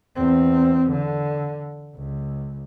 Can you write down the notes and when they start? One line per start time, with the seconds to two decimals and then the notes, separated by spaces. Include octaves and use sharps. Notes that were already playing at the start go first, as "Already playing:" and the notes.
0.16 E2 C4
0.91 D3
1.96 C#2